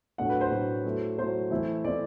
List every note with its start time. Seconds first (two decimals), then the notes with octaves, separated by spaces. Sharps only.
0.18 A2 F#3 A3 D4 F#5
0.29 B4
0.41 C5
0.51 A2 F#3 A3 D4
0.85 F#3 A3 E4
1.18 F#3 A3 E4 C5
1.51 E3 A3 C4 E4
1.84 E3 A3 C4 E4 D5